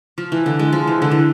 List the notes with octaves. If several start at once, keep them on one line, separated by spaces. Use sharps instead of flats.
F3
E3
D3
G#3
F3
E3
D3
E3